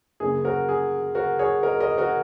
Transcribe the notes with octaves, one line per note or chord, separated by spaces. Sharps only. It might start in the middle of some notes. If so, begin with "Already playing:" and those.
F#2 C#3 A#3 C#4 G#4
F#4 A#4
G#4
F#4 A#4
G#4 C#5
A#4 D#5
A#4 D#5
F#4 A#4